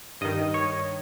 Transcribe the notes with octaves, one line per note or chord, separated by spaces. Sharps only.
G2 D#3 D#5
C#5